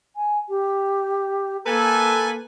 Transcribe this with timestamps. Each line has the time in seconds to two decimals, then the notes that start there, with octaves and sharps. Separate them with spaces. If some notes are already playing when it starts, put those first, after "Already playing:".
0.16 G#5
0.49 G4
1.66 A#3 A4 B4 G#5